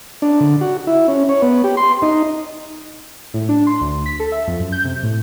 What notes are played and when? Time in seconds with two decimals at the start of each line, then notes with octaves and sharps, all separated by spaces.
0.22 D4
0.40 D3
0.61 F#4
0.87 E4
1.08 C#4
1.29 C#5
1.42 B3
1.64 G4
1.77 C6
2.02 D#4
3.34 A2
3.49 D4
3.67 C6
3.81 D2
4.06 B6
4.20 A4
4.32 E5
4.48 F2
4.60 F#2
4.72 G6
4.85 C3
5.03 A2